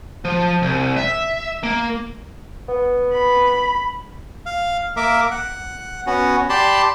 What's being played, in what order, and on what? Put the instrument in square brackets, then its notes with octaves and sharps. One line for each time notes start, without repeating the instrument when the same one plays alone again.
[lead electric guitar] F3
C2
E5
A#3
[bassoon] B3
[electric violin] B5
[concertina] F5
A#3 A#4 E5 D6
F#5
B3 C#4 F#4
G4 D5 A5 B5 C6